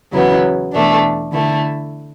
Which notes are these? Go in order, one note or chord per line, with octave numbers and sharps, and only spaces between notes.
E2 C#3 F#3 B3 E4
E2 B2 A3 D4
D3 A3 E4